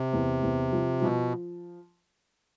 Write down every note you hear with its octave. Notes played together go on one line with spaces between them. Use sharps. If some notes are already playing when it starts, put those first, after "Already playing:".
Already playing: C3
E2
E2
F3
B2 F3